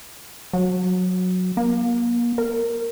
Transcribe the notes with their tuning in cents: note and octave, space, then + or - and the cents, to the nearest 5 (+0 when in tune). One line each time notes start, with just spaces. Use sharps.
F#3 -15
A#3 +35
A#4 -5